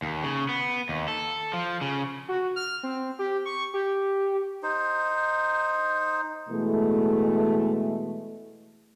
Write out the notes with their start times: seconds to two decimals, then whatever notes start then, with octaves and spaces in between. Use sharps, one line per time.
0.02 D#2
0.24 C#3
0.49 B3
0.89 D#2
1.08 A4
1.54 F3
1.82 C#3
2.28 F#4
2.56 F6
2.83 C4
3.19 G4
3.46 C#6
3.74 G4
4.63 D#4 C5
6.50 B2 E3 G#3 A3